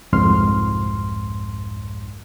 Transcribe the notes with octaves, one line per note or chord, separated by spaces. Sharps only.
C2 F2 G#2 C6 F6